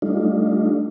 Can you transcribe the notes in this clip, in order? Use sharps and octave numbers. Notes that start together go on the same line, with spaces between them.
G3 A3 D4 D#4 F4